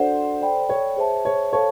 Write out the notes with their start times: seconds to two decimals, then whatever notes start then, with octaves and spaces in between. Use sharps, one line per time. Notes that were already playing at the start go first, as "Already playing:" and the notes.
Already playing: D4 F#4 A4 C5 D5 F#5
0.41 A4 D5 G5 B5
0.69 C#5
0.97 G#4 C5 E5 A5
1.25 C#5
1.53 A4 C5 C#5 F5 A5 C#6